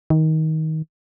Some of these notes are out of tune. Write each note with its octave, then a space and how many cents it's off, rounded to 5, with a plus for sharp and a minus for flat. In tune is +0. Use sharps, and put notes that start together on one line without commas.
D#3 +20